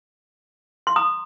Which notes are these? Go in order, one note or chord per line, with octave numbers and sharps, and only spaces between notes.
C6
A#5 D#6